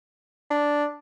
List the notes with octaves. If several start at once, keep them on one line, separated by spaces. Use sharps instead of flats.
D4